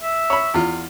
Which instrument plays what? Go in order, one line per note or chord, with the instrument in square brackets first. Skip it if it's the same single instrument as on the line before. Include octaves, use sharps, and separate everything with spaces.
[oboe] E5
[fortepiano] C#5 B5
E2 F4